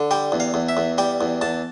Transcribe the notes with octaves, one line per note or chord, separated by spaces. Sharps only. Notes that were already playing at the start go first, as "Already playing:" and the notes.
Already playing: D3
G3 G5
E2
F5
E2
E5
E2
G3 G5
E2
E2 A5